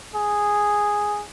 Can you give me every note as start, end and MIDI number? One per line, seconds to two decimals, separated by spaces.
0.15 1.23 68